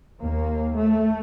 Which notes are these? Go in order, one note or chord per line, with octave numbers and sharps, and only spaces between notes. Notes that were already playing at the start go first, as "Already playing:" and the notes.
D#2 A#3
A3